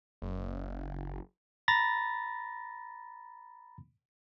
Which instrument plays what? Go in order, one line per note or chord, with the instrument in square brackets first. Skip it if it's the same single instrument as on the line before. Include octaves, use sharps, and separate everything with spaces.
[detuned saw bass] F#1
[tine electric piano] A#5 B5 A6 A#6